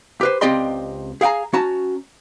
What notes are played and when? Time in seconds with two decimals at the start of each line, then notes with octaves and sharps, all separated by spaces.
0.21 G4 B4 C5
0.41 C#2 C4 G4 D5 D#5 C6
1.21 G#4 F5 G5 G#5 A#5
1.53 C#4 F#4 A5 A#5